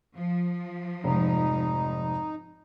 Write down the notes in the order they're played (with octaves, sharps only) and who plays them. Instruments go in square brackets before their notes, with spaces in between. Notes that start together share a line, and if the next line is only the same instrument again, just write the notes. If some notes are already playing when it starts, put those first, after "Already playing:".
[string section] F3
[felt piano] F1 G#2 [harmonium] D#4